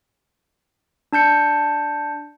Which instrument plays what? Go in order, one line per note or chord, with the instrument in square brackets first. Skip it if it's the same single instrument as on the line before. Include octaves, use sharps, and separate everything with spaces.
[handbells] D4 A5 G6 C#7